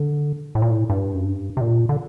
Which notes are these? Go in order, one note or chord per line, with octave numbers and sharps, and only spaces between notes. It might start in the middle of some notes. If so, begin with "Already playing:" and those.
Already playing: D3
A2
A#2
A2
G2
F#2
G2
C3
A#2
D3